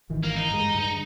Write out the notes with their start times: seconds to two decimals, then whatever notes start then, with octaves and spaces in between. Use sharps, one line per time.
0.09 G#1 D#3 E3
0.23 A#3
0.37 D#4
0.51 G2 G#3
0.74 G2 D3